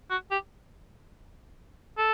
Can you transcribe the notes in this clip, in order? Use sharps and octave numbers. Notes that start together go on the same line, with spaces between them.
F#4
G4
A4